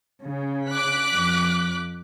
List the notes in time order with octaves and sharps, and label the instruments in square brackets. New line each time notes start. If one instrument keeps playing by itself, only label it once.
[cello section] C#3
[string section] D6 F#6 B6
[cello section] F2